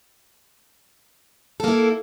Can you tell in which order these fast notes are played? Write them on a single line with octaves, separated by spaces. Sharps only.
A4 A#3 E4